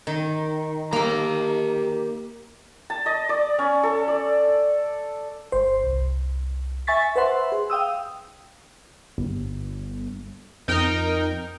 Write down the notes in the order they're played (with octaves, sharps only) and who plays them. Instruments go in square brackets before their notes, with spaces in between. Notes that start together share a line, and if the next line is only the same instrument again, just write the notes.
[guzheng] D#3
[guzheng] A#3 A#4 [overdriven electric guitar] G4 A#5
[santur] A5
D#5
D5
C#4
A4
D5
[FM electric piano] G1 C5
C2
E5 G#5 C#6 A6 B6
B4 C5 E5 F#5 C6
G#4
F5 G5 D#6 E6
[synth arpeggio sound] G1
[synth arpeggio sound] F2 [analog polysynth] D#4 A#4 G5